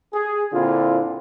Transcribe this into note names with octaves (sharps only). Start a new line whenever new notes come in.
G#4
A#2 D3 C4 E4 F4